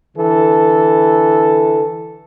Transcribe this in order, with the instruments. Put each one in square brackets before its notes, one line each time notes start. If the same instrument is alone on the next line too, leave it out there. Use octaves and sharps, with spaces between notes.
[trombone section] D3 E3 A4